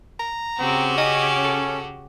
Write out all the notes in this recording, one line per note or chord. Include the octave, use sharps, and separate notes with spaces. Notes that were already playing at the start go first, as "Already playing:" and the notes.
A#5
C#3 C4 F#4 G4
C#4 D#5
A4